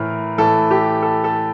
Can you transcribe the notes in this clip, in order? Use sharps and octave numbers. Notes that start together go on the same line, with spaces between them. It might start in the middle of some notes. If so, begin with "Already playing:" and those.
Already playing: A2 E3 A#4
A2 E3 A4
G4
A4
A4